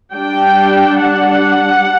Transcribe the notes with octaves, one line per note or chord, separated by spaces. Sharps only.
G3 D4 G5
F#5